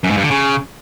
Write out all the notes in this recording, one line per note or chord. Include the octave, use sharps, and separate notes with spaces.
F#2
G#2
G2
D3
C#3